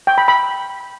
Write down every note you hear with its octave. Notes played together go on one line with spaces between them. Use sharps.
G5
B5
B5